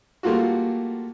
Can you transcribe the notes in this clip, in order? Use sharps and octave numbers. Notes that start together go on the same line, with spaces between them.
G3 A3 A#3 F4 F#4